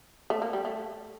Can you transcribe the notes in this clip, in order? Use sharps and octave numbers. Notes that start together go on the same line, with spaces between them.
A3
A#3
G3
A3